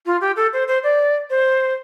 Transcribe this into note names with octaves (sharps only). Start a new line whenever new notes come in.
F4
G4
A4
C5
C5
D5
C5